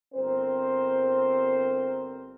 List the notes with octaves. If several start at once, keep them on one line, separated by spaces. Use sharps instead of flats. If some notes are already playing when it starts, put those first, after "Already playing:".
G1 C4 A#4 C5